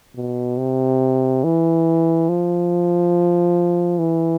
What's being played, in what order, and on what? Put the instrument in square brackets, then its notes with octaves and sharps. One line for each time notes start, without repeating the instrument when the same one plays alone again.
[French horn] B2
C3
E3
F3
E3